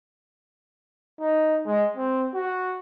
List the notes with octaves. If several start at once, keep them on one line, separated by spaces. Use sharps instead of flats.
D#4
G#3
C4
F#4